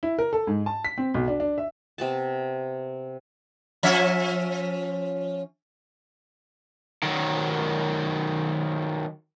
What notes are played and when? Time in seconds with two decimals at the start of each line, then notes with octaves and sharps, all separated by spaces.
0.03 E4
0.18 A#4
0.33 A4
0.47 G#2
0.66 A5
0.85 B6
0.98 C4
1.14 B1
1.28 D4
1.40 D4
1.58 E5
1.98 C3 B3 A5
3.83 F3 C#4 E5
7.03 D#3 F#3